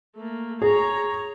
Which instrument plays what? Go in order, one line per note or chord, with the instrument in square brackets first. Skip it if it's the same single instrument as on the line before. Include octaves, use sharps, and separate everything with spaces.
[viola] A3 A#3
[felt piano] G#4 [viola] C#5 A#5